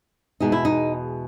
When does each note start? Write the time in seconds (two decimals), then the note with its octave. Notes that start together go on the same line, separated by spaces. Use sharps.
0.40 E2 B2 G#3 D#4
0.52 E4
0.65 D#4